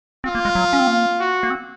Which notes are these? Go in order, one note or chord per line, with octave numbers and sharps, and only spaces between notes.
C4 F4
A#3
G#3
F#3
C#4
C4
A#3
F#4
A#3
C4